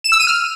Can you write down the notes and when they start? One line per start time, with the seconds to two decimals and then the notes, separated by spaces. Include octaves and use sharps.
0.04 E7
0.12 E6
0.19 D#7
0.27 F6